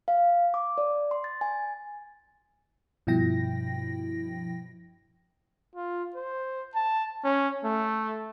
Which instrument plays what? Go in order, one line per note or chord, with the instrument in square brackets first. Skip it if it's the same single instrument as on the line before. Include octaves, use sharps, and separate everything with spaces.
[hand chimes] F5
D6
D5
C6
A6
G#5
[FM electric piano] G2 B2 F3 E4 G5 A#6
[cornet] F4
C5
A5
C#4
A3